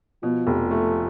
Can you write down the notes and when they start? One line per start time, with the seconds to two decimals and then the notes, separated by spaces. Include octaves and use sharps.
0.23 B2 F3
0.47 F1
0.71 A3